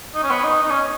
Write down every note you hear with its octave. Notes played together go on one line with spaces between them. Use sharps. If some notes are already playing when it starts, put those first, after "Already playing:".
D#4
C#4
B3
D#4
D#4
C#4